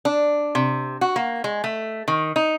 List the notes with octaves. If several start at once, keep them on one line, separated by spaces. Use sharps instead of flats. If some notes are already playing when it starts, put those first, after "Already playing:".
D4
C3
F#4
A#3
G#3
A3
D#3
D#4